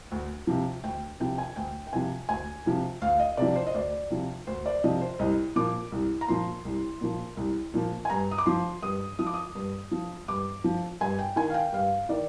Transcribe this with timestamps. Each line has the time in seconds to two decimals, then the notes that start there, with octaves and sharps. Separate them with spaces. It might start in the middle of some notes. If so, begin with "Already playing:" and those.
0.12 D2
0.47 C3 F3
0.84 D2 G5
1.20 C3 F3 G5
1.38 G#5
1.56 D2 G5
1.87 G5
1.93 C3 F3 G#5
2.29 D2 G#5
2.66 C3 F3
3.02 D2 F5
3.19 D#5
3.37 C3 F3 D5
3.56 C5
3.67 D#5
3.74 D2 D5
4.10 C3 F3
4.47 D2 C5
4.66 D5
4.83 C3 F3 D#5
5.01 C5
5.19 C2 D#5
5.56 A#2 F3 D6
5.92 C2
6.21 A#5
6.28 A#2 F3 C6
6.65 C2
7.01 A#2 F3
7.37 C2
7.74 A#2 F3
8.05 G#5
8.10 G2 A#5
8.31 D#6
8.38 D6
8.46 F3 C6
8.83 G2 D#6
9.19 F3 D#6
9.27 D6
9.34 D#6
9.55 G2
9.91 F3
10.28 G2 D6
10.64 F3
11.01 G2 G#5
11.19 G5
11.36 D#3 G#5
11.50 F5
11.54 G5
11.73 G2 F5
12.09 D#3 D5